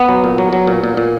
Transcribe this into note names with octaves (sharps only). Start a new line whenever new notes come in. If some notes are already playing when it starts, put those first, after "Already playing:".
Already playing: B3
F#3
A#2
F#3
F#3
A#2
A#2
A#2